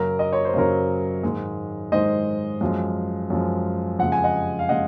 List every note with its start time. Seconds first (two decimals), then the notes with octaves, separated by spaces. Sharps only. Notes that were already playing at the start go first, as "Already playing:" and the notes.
Already playing: F#2 C#3 F#3 A#4
0.19 D#5
0.33 C#5
0.45 C5
0.54 F#2 C#3 F#3 A#4 C#5
1.23 G#2 D#3 G#3
1.92 G#2 D#3 G#3 C5 D#5
2.61 F#2 F3 G#3
3.30 F#2 F3 G#3
3.99 F2 C#3 G#3 F#5
4.12 G#5
4.24 D#5 F#5
4.59 F5
4.69 C#3 G#3 D#5 F#5